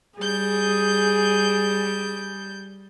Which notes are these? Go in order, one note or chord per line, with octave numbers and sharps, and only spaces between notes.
G3 G#4 G6